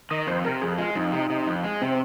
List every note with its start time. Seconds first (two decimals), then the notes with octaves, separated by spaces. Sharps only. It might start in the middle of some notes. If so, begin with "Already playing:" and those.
0.10 D#3 D#5
0.27 F2 C5
0.45 C3 A#4
0.62 F2 G#4
0.78 G#3 F4
0.95 F2 D#4
1.12 C3
1.30 C3
1.47 F2
1.64 G#3
1.81 C3 C4